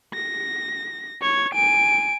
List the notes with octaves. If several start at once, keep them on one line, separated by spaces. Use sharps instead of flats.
A#6
C#5 G#6
G#5 D7